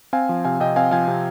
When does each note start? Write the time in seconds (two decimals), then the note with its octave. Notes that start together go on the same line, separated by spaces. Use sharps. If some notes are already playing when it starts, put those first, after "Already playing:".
0.13 C4 F5 G#5
0.29 F3
0.45 C3 F5 G#5
0.60 C3 D#5 G5
0.76 C4 F5 G#5
0.91 F3 F5 G#5
1.08 C3